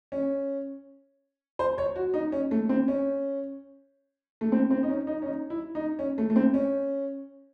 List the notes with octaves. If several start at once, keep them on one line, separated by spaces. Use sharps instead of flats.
C#4
C5
C#5
F#4
D#4
C#4
A3
C4
C#4
A3
C4
C4
D#4
C#4
D#4
C#4
D#4
E4
D#4
C#4
A3
A3
C4
C#4